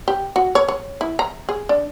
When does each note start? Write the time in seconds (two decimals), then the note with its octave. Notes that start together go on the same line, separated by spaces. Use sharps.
0.08 G4
0.36 F#4
0.55 C#5
0.68 C#5
1.01 E4
1.19 A#5
1.49 G#4
1.69 D4